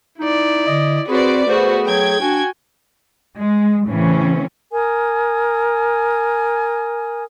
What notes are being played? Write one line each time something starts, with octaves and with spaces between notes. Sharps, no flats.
D#4 E4 D5
D3 D#5
C4 F#4 G#4 B4 C5 D5
A3 B3 F#4 G#4 C5
F#3 G5 G#6
D4 F#4 G#5
G#3
A2 C#3 E3 C4 C#4
A#4 G#5 D#6